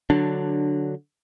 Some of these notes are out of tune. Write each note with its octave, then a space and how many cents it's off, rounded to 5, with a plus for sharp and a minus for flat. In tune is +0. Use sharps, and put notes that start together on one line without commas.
D3 +0 F#3 +0 D4 +10